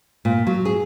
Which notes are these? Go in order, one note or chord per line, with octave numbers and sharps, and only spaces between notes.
A#2
F#3
G#4